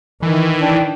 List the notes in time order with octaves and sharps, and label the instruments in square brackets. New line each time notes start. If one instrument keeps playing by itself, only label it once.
[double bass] D#3 [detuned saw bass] E3
[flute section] D4 G5